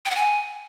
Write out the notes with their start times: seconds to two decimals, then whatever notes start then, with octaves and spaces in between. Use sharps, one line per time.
0.05 G5
0.10 F#5
0.16 G#5